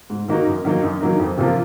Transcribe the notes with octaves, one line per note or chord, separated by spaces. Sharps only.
G#2
D#3 A#3 D#4 F#4
F#2
D#3 F#3 A#3 D#4
F#2
D#3 F#3 A#3 D#4
F2
C3 F3 A#3 F4